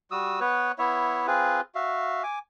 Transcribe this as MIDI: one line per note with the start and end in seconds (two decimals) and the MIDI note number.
0.11 0.40 55
0.11 0.40 66
0.11 0.40 87
0.11 0.40 88
0.41 0.72 59
0.41 0.72 71
0.41 0.72 73
0.79 1.27 59
0.79 1.27 64
0.79 1.27 73
0.79 1.27 76
1.27 1.61 60
1.27 1.61 65
1.27 1.61 68
1.27 1.61 71
1.75 2.23 66
1.75 2.23 76
1.75 2.23 77
2.23 2.39 80
2.23 2.39 86